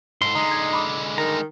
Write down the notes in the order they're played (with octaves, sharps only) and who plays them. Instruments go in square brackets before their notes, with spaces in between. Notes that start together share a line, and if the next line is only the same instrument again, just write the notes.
[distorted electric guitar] G#2 A4 [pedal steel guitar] C6
[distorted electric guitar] D3 G#3 [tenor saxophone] D#4 [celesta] A#5
[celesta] G#6
B5 D6
[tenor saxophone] D#3 [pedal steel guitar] A#5